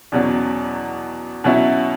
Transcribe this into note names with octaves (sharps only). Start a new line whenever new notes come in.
E2 B2 F#3 C#4
B2 F#3 C#4 E4